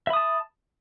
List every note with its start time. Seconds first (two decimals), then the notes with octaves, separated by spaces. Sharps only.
0.07 E5
0.10 B5
0.13 D#6
0.17 A5